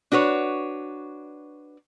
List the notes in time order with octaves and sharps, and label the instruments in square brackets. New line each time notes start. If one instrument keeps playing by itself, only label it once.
[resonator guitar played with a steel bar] D4 F#4 B4 C#5